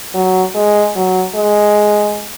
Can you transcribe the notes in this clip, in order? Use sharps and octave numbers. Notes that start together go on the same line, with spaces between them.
F#3
G#3
F#3
G#3